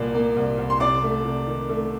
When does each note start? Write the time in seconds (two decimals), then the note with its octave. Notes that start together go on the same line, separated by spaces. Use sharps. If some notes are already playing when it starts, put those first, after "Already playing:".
Already playing: C2 A#2 A#3 D5
0.14 A#3
0.37 C2
0.58 C2
0.70 C6
0.80 C3 D5 D6
1.03 A3
1.25 C3
1.47 D#3
1.69 A3